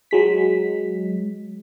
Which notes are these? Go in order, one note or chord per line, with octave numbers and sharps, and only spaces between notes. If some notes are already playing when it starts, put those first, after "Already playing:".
F#3 G#3 B6